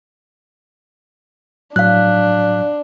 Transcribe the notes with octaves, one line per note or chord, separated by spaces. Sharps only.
A2 F#3 D4 F5 F#6